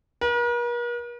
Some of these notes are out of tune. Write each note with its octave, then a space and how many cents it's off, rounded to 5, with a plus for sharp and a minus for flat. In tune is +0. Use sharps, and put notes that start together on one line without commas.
A#4 +45